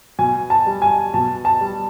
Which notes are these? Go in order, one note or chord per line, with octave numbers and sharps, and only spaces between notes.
B2 G#5
A5
G3
G#5
B2 A5
A5
G3